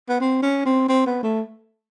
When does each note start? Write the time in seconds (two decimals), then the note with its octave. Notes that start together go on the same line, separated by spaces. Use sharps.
0.09 B3
0.20 C4
0.42 C#4
0.65 C4
0.89 C4
1.06 B3
1.23 A3